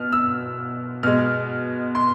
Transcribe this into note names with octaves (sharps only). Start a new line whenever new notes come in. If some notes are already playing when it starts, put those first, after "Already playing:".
Already playing: B2 F6
E6
B2 G#3 F6
C6